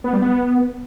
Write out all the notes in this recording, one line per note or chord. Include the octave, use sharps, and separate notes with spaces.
B3
G3
B3